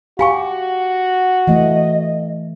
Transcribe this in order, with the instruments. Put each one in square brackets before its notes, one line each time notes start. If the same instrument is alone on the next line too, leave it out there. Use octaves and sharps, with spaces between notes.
[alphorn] F#4 [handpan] G4 [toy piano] F5 G#5 C#6
[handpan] E3 A3 [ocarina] D#5